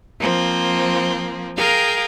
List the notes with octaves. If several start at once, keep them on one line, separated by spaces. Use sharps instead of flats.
F3 A#3 C4
G#4 A#4 F5 G5